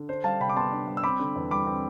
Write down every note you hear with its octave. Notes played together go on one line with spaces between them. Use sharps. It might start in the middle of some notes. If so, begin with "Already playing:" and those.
Already playing: D3
D4 C5
G3 F5 A5
C3 G5 B5
D6
B3 A5 C6
D4
G3
E6
C4 B5 D6
D3
E2
G3 B5 D6
C4